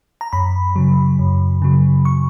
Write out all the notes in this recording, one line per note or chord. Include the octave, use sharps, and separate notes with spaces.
A#5
F#2 B5
C#3 F#3
F#2
C#3 F#3
C#6